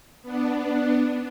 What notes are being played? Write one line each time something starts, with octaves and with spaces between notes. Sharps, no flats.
B3 D4